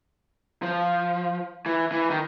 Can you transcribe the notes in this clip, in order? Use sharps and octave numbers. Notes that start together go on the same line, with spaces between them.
F3
E3
E3
D#3